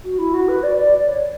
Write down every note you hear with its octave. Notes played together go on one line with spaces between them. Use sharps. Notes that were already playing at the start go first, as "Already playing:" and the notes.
F#4
E4
F#4
B4
D5
D5
C#5